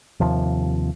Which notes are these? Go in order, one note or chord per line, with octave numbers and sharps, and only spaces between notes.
D#2 C3 F3